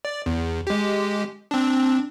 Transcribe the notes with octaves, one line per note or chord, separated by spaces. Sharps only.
D5
E2
G#3 G4
C4 D4